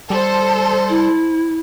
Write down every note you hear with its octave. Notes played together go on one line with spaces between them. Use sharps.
G3 A4 C5 A5
E4